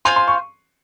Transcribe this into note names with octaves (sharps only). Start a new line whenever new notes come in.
F4 C5 F5 G#5 C6
C6
C#6